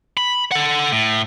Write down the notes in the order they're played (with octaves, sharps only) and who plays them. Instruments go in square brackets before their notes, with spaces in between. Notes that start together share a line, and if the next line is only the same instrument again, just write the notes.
[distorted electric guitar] B5
A4 F#5
A2